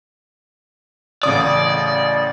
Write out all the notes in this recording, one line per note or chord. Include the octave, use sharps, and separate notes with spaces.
A1 C#3 D5 D#6